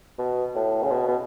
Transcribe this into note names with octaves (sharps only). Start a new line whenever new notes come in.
B2
A2
C#3
B2
B2